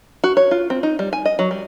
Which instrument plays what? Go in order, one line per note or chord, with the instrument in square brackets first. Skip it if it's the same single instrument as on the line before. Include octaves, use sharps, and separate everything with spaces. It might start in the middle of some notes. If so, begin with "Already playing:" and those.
[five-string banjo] F#4
C#5
F4
C4
D#4
G3
G#5
D#5
F#3
G3